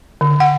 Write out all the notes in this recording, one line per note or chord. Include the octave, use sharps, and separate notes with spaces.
D3
F#5